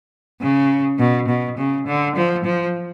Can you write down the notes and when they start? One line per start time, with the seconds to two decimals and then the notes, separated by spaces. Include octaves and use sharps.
0.41 C#3
0.99 B2
1.28 B2
1.58 C#3
1.87 D3
2.16 F3
2.44 F3